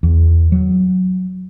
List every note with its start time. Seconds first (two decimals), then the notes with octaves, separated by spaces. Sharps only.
0.03 E2
0.52 F#3